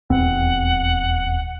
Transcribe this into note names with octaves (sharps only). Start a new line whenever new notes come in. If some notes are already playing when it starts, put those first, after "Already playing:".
D#1 E2 C4 F#5